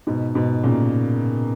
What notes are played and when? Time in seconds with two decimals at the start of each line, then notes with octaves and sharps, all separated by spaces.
0.07 G#2 B2
0.35 G#2 B2
0.63 A#2 C#3